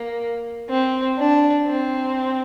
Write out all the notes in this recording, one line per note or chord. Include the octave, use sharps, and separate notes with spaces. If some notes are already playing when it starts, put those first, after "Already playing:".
Already playing: A#3
C4
D4
C4